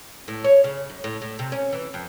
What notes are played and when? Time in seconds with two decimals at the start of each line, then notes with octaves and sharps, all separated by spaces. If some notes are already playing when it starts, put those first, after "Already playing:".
0.28 A2
0.44 C#5
0.64 C#3
0.89 F#2
1.04 A2
1.22 A2
1.39 C3
1.52 C#4
1.72 E3
1.94 F2